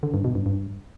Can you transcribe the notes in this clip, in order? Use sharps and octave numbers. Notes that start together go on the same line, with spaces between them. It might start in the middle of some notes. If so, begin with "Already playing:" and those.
D3
G2
B2
G2
G2